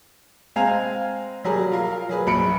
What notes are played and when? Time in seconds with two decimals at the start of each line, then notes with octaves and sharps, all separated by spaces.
0.56 G#3 C4 F5 G#5 A#5 F7
1.44 F#3 G3 G#4 A#4
1.72 F4 A#4 F5
2.09 F#3 G#4 B4
2.27 A#1 F#2 B5 C#7 D7